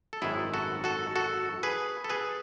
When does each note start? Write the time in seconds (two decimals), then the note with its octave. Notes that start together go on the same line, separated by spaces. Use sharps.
0.13 A4
0.22 G#1 F#2 D#3 G#3 E4 G#4
0.54 F#4 A4
0.84 F#4 A4
1.16 F#4 A4
1.63 G#4 B4
2.04 A4
2.09 G#4 B4